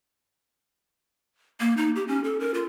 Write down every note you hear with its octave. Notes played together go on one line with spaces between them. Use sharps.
A#3
D#4
G4
C#4
A4
A#4
F4